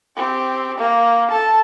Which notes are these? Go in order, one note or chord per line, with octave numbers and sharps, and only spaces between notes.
C4 G4
A#3
A4 A5